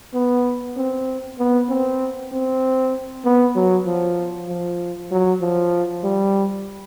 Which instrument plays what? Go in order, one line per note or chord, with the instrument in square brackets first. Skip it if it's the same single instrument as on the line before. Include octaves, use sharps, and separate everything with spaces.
[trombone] B3
C4
B3
C4
C4
B3
F#3
F3
F3
F#3
F3
G3